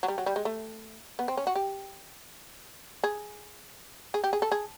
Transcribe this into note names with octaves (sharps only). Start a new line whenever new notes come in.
F#3
G3
F#3
G3
G#3
A3
B3
C4
C#4
F#4
G4
G#4
G#4
G4
G#4
A4
G#4